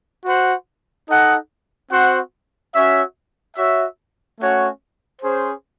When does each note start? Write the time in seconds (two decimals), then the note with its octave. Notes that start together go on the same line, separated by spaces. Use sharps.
0.24 F#4 C5 F#5
1.08 D#4 A4 D#5 F#5
1.91 C4 F#4 C5 F#5
2.74 C#4 F#4 C#5 E5
3.56 F#4 C#5 E5
4.40 A3 C#4 F#4 C#5 F#5
5.22 C#4 G#4 C5